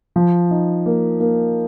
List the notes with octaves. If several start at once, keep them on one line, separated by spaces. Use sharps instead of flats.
F3
D#4
A#3
A#3